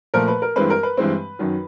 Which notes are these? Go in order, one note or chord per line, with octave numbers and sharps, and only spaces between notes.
A#2 F3 A3 A#4
B4
A#4
G2 E3 G#3 C4 B4
A#4
B4
G2 E3 G#3 C4
F#2 D#3 F#3